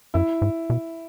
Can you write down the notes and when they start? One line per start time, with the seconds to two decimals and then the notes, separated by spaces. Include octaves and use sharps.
0.14 F#2 E4
0.42 G#2
0.70 B2